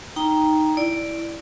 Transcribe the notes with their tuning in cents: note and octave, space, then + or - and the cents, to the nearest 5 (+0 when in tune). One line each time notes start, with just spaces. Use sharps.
D#4 +0 G5 +0 A#5 +5
E4 +0 D5 +0